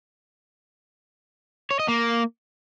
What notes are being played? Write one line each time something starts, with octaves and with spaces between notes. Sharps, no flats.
C#5
D#5
A#3